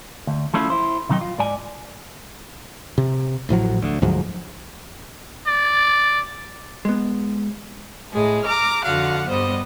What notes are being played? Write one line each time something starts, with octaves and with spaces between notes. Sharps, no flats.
D2
F3 A3 C#4 E4 F4
E4 C5
C3 D#3 F#3 D#4 G5
F4
G#2 D5 G#5
C3
A1 A2 F3 F#3
D2
D2 G#2 F3 F#3
D5
G#3 B3
A2 G#3 G#4
A#5 D6 F6
F2 D3 F#4 F5 F#5
G2 G3 B3 C5 D#5